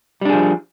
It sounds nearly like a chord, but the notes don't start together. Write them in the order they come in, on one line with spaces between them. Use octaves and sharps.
G3 D4 G#4 F3